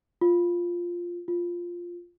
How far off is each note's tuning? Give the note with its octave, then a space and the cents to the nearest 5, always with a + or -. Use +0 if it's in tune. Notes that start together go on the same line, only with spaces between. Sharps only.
F4 +0
F4 +0